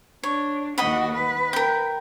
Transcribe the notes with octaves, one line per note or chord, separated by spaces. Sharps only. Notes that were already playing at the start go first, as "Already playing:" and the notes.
D4 C#5
D#2 F#4 D#5 F#5 B5
B4
A#4 G5